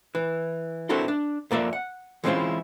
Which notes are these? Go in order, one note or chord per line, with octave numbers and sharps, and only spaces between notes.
E3
C4 D4 E4 F#4 A4 A#4
D4
F2 A#3 D5 E5
F#5
E3 G#3 C4 C#4 E4 F4